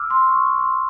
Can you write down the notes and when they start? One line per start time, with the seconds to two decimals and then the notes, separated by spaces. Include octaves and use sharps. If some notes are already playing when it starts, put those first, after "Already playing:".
Already playing: D6 E6 F6
0.10 C6
0.29 C#6
0.46 D6
0.60 C6
0.64 C#6